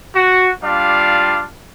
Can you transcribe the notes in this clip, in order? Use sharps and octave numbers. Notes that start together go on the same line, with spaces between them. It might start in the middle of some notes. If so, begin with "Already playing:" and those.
F#4
G3 D4 F4 F5